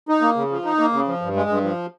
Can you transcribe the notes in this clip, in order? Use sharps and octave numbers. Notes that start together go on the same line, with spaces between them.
D#4
A#3
C#3
F3
D#4
A#3
C#3
F3
G2
G#3
G2
F3